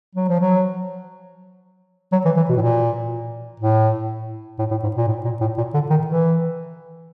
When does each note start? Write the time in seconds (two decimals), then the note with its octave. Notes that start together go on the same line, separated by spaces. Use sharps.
0.15 F#3
0.28 F3
0.40 F#3
2.12 F#3
2.25 E3
2.36 E3
2.49 B2
2.56 A2
2.62 A#2
3.60 A2
4.59 A2
4.71 A2
4.83 G#2
4.96 A#2
5.08 A2
5.24 A#2
5.41 A2
5.57 A#2
5.74 D3
5.90 D#3
6.07 E3